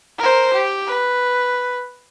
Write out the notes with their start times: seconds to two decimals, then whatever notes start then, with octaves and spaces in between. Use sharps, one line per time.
0.19 A#4 C5
0.54 G4
0.87 B4